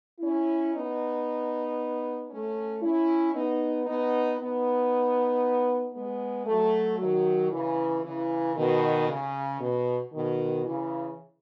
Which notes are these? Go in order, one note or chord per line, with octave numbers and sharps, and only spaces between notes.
C#4 E4
B3 D#4
A3 C#4
C#4 E4
B3 D#4
B3 D#4
B3 D#4
G#3 B3
F#3 A3
D#3 F#3
C#3 E3
C#3 E3
B2 D#3
C#3
B2
B2 D#3
C#3 E3